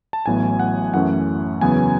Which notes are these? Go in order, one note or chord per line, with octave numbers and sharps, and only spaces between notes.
A5
A1 A2 F#3 B3 G#5
F#5
F#2 E3 A3 C#4 F#5
E2 C#3 F#3 B3 G#5